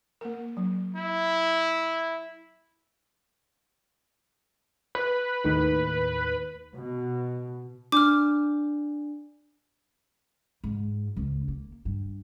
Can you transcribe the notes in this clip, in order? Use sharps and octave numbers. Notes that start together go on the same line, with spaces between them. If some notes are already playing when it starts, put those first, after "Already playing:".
A#3 A#4
F#3
E4
B4
D#2 A2 D#3
B2
D4 D6 F6
G#2
C#2
A#3
G2